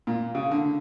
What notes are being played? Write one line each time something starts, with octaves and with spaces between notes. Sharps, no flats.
A#2
C#3
D3